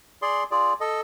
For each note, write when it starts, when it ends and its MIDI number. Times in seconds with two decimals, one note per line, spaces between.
0.22 0.44 68
0.22 0.44 74
0.22 0.44 84
0.51 0.73 65
0.51 0.73 68
0.51 0.73 74
0.80 1.01 69
0.80 1.01 75